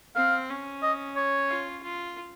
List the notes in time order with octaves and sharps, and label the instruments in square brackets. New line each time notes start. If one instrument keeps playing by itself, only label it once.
[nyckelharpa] C4 [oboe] F5
[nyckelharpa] C#4
[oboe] D#5
C#5
[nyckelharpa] F4
F4